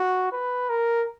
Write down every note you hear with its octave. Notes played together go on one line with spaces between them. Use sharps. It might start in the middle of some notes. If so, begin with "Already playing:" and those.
Already playing: F#4
B4
A#4